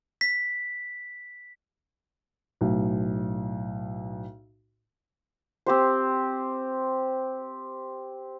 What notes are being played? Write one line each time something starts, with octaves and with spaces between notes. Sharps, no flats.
B6
B1 A2
C4 G4 C5